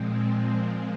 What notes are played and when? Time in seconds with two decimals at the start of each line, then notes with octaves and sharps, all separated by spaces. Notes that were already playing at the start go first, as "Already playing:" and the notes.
Already playing: A#2 F3 G#3 C4
0.11 C4
0.65 C4